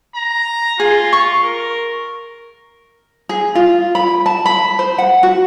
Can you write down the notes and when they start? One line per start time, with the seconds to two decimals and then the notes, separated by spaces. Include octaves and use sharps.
0.15 A#5
0.80 F4 G#4
1.13 C#6
1.44 A#4
3.29 G#4
3.55 F4
3.95 B5
4.26 A5
4.46 B5
4.79 C5
4.98 F#5
5.23 F#4